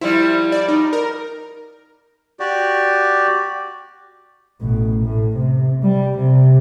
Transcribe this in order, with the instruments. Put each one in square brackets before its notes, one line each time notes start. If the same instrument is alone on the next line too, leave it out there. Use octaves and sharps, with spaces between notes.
[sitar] F3 G3 [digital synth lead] E4
[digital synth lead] D5
D#4
A#4
[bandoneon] F#4 G4 D5
[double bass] A1 B2
A2
C3
G3
C3